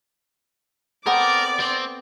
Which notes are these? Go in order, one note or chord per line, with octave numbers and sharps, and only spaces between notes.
B3 C4 A4 A#4 D5 D6
C4 G5